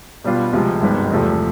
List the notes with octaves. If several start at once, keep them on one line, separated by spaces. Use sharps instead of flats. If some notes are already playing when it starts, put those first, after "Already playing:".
B2 G3 B3 D4 F4
D2 C3 F3 G#3
G#1 G2 D#3 G#3 B3
E2 C3 F3 A3